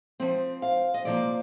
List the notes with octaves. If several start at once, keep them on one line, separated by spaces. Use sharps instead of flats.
F3 C4
F5
D#5
C3 F3 A#3 D5